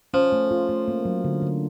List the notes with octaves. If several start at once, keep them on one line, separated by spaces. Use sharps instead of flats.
F3 C#4
A3
F4
A3
A#3
F#3
D3
D3